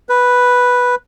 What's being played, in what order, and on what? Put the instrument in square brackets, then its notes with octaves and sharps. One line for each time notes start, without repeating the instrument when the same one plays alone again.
[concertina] B4